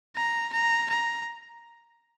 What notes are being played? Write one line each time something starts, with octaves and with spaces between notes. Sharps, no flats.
A#5
A#5
A#5